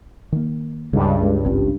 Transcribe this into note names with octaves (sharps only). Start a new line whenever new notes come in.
D#3 A#3
C#2 G2 C#3 G3
G#3
G#1 C4